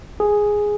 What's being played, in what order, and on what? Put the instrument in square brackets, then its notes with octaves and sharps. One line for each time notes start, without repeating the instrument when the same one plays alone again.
[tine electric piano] G#4